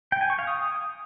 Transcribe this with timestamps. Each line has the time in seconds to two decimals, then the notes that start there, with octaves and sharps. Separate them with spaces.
0.12 G5
0.21 G#5
0.30 C#6
0.39 F5
0.47 D#6